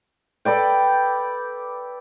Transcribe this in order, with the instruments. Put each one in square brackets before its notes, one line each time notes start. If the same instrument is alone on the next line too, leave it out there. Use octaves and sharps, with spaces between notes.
[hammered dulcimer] A4 B4 D5 G5